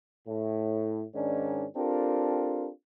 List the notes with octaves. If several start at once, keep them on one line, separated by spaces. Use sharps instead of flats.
A2
G#2 D#3 C#4 D4
C4 D4 F4 G4 A4 A#4